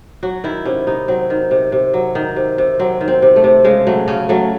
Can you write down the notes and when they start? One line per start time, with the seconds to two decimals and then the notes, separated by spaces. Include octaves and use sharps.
0.23 F#3 F#4
0.44 D#3 E4
0.65 C3 C#4
0.87 C3 D#4
1.08 F#3 C4
1.30 D#3
1.51 C3
1.72 C3
1.94 F#3
2.15 D#3
2.36 C3
2.58 C3
2.79 F#3 C4
3.01 D#3
3.08 C4
3.22 C3
3.36 A3
3.44 C3
3.64 C#3 G#3
3.87 F#3 A3
4.08 C#3 C#4
4.29 F#3 A3